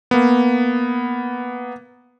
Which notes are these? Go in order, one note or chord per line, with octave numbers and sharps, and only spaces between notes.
A#3 B3